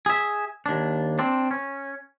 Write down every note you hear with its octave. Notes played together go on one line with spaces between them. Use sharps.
G#4 E5
D#2 D4
C4 D4
C#4